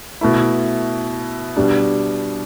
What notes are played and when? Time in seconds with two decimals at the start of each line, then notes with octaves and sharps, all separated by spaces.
0.21 B2 A3 E4
1.56 B2 G3 D4